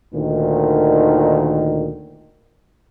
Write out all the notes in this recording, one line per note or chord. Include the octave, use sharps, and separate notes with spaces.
D2 A#2 D#3